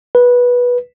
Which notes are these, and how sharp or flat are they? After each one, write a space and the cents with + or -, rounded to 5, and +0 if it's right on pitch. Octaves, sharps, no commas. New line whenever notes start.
B4 -15